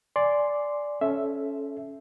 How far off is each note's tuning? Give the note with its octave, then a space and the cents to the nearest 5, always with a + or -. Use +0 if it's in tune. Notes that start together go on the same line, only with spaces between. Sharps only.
D5 -5 G#5 +0 C6 +0
C#4 +0 A4 -25 E5 +0